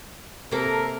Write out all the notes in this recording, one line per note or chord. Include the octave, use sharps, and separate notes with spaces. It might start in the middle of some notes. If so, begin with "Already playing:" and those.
C3 A#3 A4 A#4